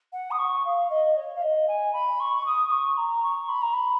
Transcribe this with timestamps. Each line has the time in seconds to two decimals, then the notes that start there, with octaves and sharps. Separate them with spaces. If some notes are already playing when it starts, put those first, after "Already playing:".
0.13 F#5
0.31 D#6
0.39 C#6
0.65 F5
0.90 D#5
1.17 C#5
1.35 F5
1.42 D#5
1.68 G#5
1.93 B5
2.20 C#6
2.46 D#6
2.72 C#6
2.97 A#5
3.23 C#6
3.49 B5
3.62 A#5
3.73 B5